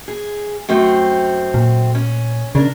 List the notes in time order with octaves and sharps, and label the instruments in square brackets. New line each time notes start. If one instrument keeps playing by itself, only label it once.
[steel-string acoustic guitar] G#4
F#2 A3 C4
[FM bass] A#2
[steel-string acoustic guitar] C#4
[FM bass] C#3 [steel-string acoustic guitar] D4 A#4